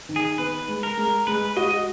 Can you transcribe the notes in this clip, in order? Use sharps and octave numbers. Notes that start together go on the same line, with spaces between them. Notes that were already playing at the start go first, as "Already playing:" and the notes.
D#3
G#4
B3 B4
G#3
A#4
G#3
G#3 B4
F#4 D#5